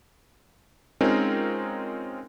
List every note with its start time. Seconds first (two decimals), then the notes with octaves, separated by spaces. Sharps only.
1.01 G#3 C4 C#4 D#4 F4 A#4